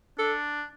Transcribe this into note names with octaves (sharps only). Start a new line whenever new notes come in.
D4 A4